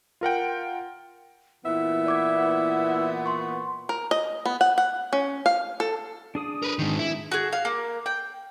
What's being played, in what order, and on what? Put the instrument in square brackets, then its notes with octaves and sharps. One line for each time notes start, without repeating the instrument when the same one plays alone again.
[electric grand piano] F4 A#4 F#5 G5
[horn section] A#2 E3 B3 [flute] E4 [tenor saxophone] E5
[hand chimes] D5 D6 G#6
C6 C#6
[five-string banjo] A#4
D#5
B3
F#5
F#5
C#4
F5
A4
[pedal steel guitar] D4 G#4 D#6
[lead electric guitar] A#4 B4
G#2 D#3
E4
[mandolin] F#4 G#4
F5
A#3
G5